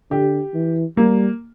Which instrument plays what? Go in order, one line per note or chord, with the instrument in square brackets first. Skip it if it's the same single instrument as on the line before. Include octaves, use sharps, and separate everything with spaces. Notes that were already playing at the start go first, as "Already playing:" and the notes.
[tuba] D3 [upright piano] G4
[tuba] E3
[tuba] G3 [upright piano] A#3